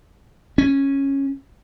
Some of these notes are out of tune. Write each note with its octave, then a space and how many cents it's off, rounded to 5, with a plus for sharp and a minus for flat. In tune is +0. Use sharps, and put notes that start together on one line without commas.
C#4 -10